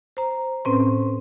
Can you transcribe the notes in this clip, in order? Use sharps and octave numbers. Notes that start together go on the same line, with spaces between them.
C5 A#5
A2 C4 C#4 B4 C5 C6